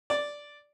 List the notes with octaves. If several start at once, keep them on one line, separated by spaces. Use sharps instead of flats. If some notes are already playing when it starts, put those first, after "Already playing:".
D5